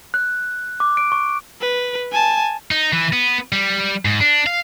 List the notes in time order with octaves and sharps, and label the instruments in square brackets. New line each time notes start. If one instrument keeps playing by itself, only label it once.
[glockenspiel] F#6
D6
D7
C#6
[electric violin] B4
G#5 A5
[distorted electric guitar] D#4
E3
B3
G3
G#2
D4
F5